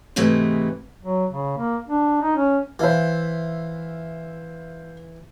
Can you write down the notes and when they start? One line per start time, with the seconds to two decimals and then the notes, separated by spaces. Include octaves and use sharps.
0.16 G#2 C3 E3 G#3 A3
1.03 F#3
1.31 C#3
1.57 A#3
1.87 D4
2.22 D#4
2.36 C#4
2.79 E3 C5 E5 F5